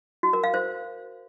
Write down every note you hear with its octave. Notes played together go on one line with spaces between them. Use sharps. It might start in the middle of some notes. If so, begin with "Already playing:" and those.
F#4
A#4
F5
C5